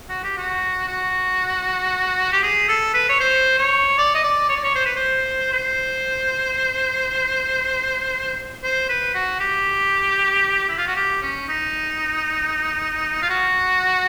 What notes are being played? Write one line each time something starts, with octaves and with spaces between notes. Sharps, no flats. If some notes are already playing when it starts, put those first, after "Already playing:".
F#4
G4
F#4
F#4
G4
G#4
A4
B4
C#5
C5
C#5
D5
D#5
D5
C#5
D5
C#5
C5
B4
C5
C5
C5
B4
F#4
G4
E4
F4
F#4
G4
C#4
D#4
F4
F#4